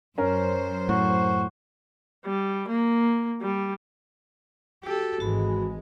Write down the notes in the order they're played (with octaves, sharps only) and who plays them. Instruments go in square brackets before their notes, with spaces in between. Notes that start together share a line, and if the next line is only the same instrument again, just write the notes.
[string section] F#2 C5 [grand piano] C#4 A#4
[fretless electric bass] A2 [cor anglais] F#4
[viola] G3
A#3
G3
[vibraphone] F#4 E6 [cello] G4 A4
[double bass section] G#1 G#3 [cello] E3 [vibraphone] F#4 B5